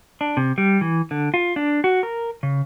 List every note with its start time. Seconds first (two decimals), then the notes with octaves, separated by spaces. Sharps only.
0.21 D4
0.37 C3
0.58 G3
0.81 E3
1.11 D3
1.34 F4
1.56 D4
1.84 F#4
2.03 A#4
2.43 C#3